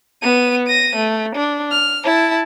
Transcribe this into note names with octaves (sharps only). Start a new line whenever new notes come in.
B3 D#7
A#6 D#7
A3
D4
F6
E4 A5